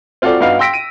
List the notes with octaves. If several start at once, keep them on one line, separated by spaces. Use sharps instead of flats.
C4 F4 F#4 A4 D5
G2 B3 D#4 F#4 F5
G5 C6 E6 A#6 B6 D7
D7 D#7